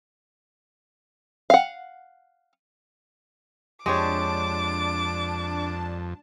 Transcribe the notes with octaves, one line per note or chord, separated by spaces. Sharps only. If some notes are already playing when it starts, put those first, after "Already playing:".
F5 F#5
F2 G#3 D4 G4 C#5 A5 D6